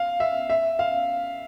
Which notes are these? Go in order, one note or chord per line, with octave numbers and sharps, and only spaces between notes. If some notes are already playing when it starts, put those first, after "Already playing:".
Already playing: F5
E5
E5
F5